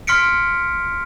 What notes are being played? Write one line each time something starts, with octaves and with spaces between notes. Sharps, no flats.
C6 F6 B6 C#7 D7